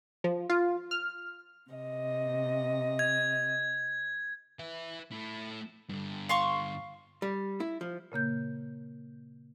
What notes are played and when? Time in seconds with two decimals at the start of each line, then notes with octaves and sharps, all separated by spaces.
0.24 F3
0.49 F4
0.91 F6
1.70 C3 D#5
2.99 G#6
4.59 B4 E5
5.12 A3 E4
5.89 G2 D3
6.29 F5 C6 C#6
7.22 G3
7.60 E4
7.81 F3
8.12 A#2 C#3 A#3 G6